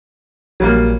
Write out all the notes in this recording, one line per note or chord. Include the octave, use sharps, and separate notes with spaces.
A#1 F#3 G3 A#3